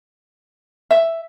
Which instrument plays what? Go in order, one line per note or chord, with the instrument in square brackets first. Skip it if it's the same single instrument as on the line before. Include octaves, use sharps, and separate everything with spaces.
[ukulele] E5